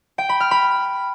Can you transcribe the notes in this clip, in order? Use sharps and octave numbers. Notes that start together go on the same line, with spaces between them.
G5
B5
F6
B5